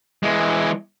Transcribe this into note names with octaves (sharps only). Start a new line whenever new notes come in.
E3 G#3